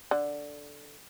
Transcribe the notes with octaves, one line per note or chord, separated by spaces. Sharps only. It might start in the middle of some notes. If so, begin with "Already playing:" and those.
D3